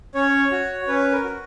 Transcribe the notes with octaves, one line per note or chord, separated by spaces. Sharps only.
C#4 C#5
F#4
C#4 B4
A#4
F#4